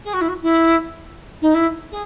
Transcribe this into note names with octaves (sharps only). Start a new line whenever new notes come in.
G#4
F#4
E4
F#4
E4
D#4
E4
G#4